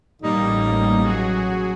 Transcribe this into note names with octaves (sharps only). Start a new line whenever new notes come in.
A1 G3 A#3 D#4
F#3 F#4 G#4